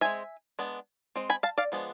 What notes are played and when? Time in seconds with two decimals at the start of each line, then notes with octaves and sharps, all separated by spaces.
0.01 G#3 C4 E5 G#5
0.59 G#3 B3 D4
1.16 G#3 C4
1.30 G#5 B5
1.43 F5 A5
1.58 D5 F5
1.72 F3 G#3 B3 D4